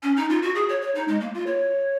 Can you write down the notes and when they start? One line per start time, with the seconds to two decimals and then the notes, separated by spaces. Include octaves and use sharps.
0.03 C#4
0.16 D#4
0.30 F4
0.42 F#4
0.55 G#4
0.69 C#5
0.81 C#5
0.95 D#4
1.08 G#3
1.21 A#3
1.34 F4
1.46 C#5